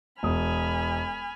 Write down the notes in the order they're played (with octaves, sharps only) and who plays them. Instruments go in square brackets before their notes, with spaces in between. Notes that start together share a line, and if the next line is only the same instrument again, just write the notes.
[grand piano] E1 D#6 [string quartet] G#5 B5 F6